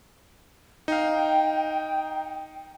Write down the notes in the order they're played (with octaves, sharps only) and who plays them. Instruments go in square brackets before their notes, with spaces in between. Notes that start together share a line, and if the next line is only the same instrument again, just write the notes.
[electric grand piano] D#4 F5 [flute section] G5